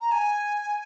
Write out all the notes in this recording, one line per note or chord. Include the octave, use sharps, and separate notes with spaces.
A#5
G#5